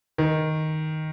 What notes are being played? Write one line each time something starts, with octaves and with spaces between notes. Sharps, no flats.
D#3